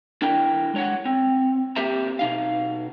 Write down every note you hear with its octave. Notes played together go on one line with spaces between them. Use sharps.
D4 E4 A#4 G5
G#3 C#5 F#5
C4
A#3 C4 G4 C5 E5 A#5
B2 D#4 F5